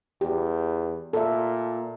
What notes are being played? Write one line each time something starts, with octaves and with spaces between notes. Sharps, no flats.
E2 G4
A#2 A4 E5